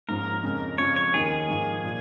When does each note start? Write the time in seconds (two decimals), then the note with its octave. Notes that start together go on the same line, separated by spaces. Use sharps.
0.09 G#2 F3 A#3 C#4 A#4
0.43 F2 C#3 G#3 C#4
0.78 F2 C#3 F3 C#4 C#5
0.96 C#5
1.14 D#2 D#3 A#3 D#4 G#4
1.31 G#4
1.48 G#2 F3 A#3 D#4
1.84 A#2 F3 A#3